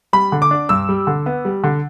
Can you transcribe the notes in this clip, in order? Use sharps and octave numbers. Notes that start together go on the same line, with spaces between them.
G3 B5
D3
D6
D4
G2 E6
G3
D3
B3
G3
D3